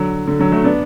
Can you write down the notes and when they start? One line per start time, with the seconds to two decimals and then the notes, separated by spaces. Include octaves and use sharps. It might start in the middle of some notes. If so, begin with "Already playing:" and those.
Already playing: D3 F#3
0.27 D3
0.39 D3 F#3
0.52 F#3 A3
0.64 B3 D4